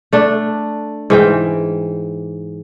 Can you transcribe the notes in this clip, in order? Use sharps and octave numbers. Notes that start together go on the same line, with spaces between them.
A3 D4
G#2 E3 G5